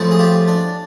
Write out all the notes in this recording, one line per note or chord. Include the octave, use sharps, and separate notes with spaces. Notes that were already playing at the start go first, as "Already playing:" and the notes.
Already playing: A2 F3 G#3 C4
G#4
F4 G4
D4